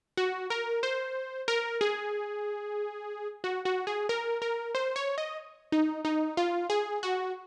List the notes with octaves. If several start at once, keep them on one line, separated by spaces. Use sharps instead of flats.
F#4
A#4
C5
A#4
G#4
F#4
F#4
G#4
A#4
A#4
C5
C#5
D#5
D#4
D#4
F4
G#4
F#4